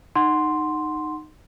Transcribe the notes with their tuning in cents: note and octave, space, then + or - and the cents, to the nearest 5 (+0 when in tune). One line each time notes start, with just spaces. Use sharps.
D#4 -15 F#5 +0 C6 +0